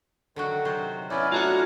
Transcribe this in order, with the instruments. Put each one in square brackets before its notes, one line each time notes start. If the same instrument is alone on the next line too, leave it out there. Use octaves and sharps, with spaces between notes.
[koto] D3 F#3 F#4 [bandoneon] D#3
[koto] C3 F#3 C5
[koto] B3 D#4 [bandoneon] C#4 E4 D5 [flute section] G#5 F6 G#6
[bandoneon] A3 D4 A#5 [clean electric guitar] F4 F#4 F#5